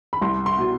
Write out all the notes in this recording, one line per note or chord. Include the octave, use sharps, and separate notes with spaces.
B5
C2 C6
C6
B2